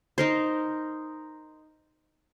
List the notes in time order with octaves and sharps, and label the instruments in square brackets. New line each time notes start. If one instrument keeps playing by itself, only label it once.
[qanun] D#4 A#4 C5